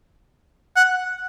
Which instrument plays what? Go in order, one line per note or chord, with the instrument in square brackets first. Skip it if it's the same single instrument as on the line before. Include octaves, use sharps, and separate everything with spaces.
[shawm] F#5